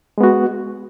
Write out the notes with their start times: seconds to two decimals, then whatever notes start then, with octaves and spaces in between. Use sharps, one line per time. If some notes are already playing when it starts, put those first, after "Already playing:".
0.18 G#3
0.21 B3
0.23 F#4